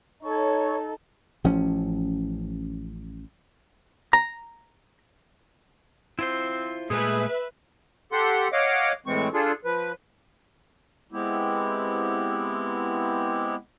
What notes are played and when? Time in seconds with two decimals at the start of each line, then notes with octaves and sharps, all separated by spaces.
0.23 D#4 A4 C#5 C#6
1.44 A1 F3 C#4
4.13 A#5
6.19 C4 E4 F4 C5
6.90 A#2 G#3 A3 G#4 B4 E5
8.12 G4 A4 F#5 C6
8.52 C#5 D#5 F5 F#5 D6
9.06 A2 E3 G#3 C4 C#6
9.33 D4 F4 G#4 A4
9.65 F3 B4
11.12 G#3 B3 C4 E4 G4